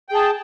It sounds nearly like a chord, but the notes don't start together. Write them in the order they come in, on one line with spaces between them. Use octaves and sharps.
G5 G#4 A5